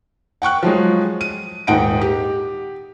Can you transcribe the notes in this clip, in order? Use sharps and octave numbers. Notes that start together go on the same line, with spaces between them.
F#5 G5 C#6 F#6
F3 F#3 G#3
D#7
D#1 G#2 D#4 F#5 G5 D7
G4